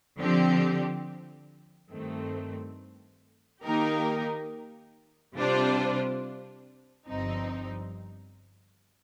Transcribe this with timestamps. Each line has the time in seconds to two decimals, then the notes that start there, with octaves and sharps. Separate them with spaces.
0.18 D3 F3 C4 G4
1.90 G2 D#3 A3 C4
3.63 D#3 A#3 D#4 G4 A#4
5.36 C3 G3 D4 F4 C5
7.08 G1 G2 F3 C4 D#4